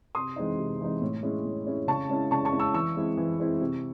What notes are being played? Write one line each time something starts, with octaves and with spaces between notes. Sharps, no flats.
C3 C6 D#6
E3 G#3 C4 D#4
C3
E3 G#3 C4 D#4
A2
G#3 C#4 E4
A2
G#3 C#4 E4
C#3 A5 C#6
G#3 C#4 E4
C#3 A5 C#6
A5 C#6
G#3 C#4 E4
C#6 E6
E3 C#6 E6
G#3 C4 E4
E3
G#3 C4 E4
C3